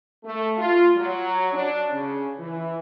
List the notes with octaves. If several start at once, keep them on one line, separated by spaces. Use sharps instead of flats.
A3
F4
F#3
D4
C#3
E3